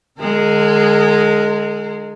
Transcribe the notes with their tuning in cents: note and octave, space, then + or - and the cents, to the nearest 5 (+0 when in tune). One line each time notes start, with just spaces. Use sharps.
D3 +25 G#3 +0 A#4 -35